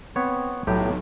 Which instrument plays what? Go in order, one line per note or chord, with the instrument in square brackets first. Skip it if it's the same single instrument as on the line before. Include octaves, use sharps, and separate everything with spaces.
[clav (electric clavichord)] B3 C#5 [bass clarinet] C4
[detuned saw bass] B1 [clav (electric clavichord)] A2 G4 [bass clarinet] F#3